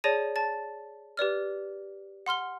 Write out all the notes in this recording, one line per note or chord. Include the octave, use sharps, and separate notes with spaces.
G#4 C#5 D5 A5 A#6 D#7
A5 A6
G4 B4 D5 F6
F#5 C6 F6 G7